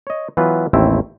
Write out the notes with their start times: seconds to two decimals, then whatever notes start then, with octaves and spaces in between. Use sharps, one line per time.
0.07 C#5 D#5
0.37 E3 F#3 B3 F4 B4
0.73 A1 D#2 A3 C4 E4